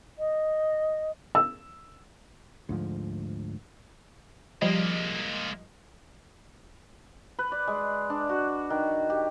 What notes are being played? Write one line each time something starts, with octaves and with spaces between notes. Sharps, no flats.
D#5
E6
D2 G#2 F3
F3 G3 G#3 A#3 D#5
B4
D5
G#3
D4
F#4
D#3
G4